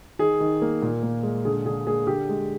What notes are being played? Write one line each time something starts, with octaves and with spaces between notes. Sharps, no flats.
D#3 G#4
D#3
A#3
A#2
A#2
G#3
D3 G#4
D3 G#4
A#3 G#4
D3 G4
G#3